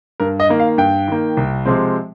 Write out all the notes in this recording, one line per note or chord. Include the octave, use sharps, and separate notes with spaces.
G2 A#4
D#5
D#3 A#3
F5
G2 G5
D#3 A#3
C2
C3 F3 G#3 C4